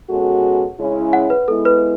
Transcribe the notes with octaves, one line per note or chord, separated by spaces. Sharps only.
B2 G#3 C#4 F#4 A4
C#3 G#3 C#4 E4
F#5
B4
G#3 B3 E4 A4
B4